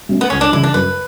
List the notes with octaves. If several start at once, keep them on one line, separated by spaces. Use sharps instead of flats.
B2 F#3 A3 C#4
B3
C#2 C#4
D4
C#3 E3 E4
D4
F#2 B4